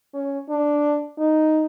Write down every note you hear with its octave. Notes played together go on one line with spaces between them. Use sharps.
C#4
D4
D#4